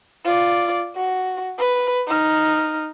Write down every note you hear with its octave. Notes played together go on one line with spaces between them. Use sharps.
F4 D5
F#4
B4
D#4 F6